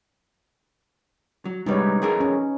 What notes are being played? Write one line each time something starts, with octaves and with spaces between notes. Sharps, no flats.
F#3
G#2 C3 G3 D#4 B4 C#5
F2 G#4 A#4
C#4